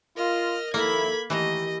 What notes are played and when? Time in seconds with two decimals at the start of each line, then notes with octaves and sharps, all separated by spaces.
0.17 F4 A#4 D#5 F6
0.74 D#2 F3 A#3 E4 A4 B5 G#6
1.30 D#2 D#3 E3 A3 G4 D#5